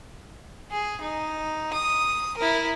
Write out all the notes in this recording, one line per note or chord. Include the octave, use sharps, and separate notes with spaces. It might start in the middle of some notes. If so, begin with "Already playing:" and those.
G#4
D#4
D#6
E4 A#4